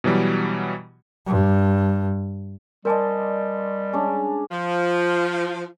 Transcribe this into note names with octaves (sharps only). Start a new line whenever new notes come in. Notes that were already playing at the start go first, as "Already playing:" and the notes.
B2 E3 F#3 G3
G2
G3 A#4 C5 D5 D#5 G#5 A5
G#3 C#4 D4
F3